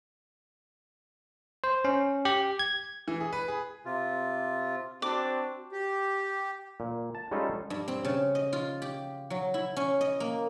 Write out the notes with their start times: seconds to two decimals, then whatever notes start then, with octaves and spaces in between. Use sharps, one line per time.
1.64 C5
1.85 C#4
2.25 G4
2.59 G#6
3.08 E3
3.20 G#4
3.33 B4
3.48 G#4
3.85 C3 F4
5.02 C4 D4 F#4 D6
5.72 G4
6.80 A#2
7.15 A5
7.31 G3 G#3 C#4 D#4 F4 A4
7.70 G2
7.88 C4
8.05 C#3
8.35 D#5
8.53 F4
8.82 G4
9.30 F#3
9.54 E4
9.76 C#4
10.01 D#5
10.20 A#3